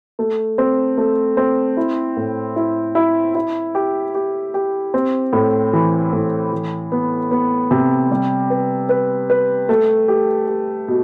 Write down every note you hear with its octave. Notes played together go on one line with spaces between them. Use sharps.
A3
C4
A3
C4
E4
A2
E4
E4
E4
G4
G4
G4
C4
A2
E3
A2
E3
B3
B3
C3
G3
B4
B4
B4
A3
G4
G4
B2